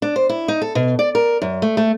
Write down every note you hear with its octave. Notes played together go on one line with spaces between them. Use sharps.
D4
C5
E4
D#4
A4
B2
D5
A#4
F#2
A3
A3